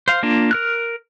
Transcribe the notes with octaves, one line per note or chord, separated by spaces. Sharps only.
C5 F5
A#3 D4 F4
A#4 F6 F#6